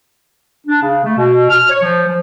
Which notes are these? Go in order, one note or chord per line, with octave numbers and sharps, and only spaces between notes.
D4
C#3
A3
B2
F6
C#5
F3
F3